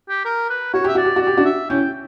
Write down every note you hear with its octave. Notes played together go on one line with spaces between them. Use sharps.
G4
A#4
B4
F#4 C#5
G4 E5
F#4 D5
G4
F#4
D5
G4
D4 F#4
E5
C#4 E4 G5